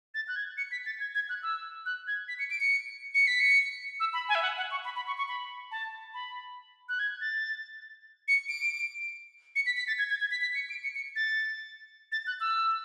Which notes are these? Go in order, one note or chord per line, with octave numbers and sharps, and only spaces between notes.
A6
F#6
G#6
C#7
B6
A6
G#6
G#6
F#6
E6
F#6
G#6
B6
C#7
D7
C#7
C#7
B6
C#7
E6
B5
G#5
E5
F#5
F#5
C#6
B5
B5
C#6
C#6
B5
A5
B5
F#6
G#6
A6
C#7
D7
C#7
B6
B6
A6
G#6
G#6
G#6
B6
B6
C#7
D7
C#7
C#7
A6
A6
F#6
E6